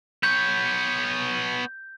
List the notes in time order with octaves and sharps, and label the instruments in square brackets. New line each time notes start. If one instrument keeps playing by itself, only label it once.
[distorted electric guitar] B3 C#5 [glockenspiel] G6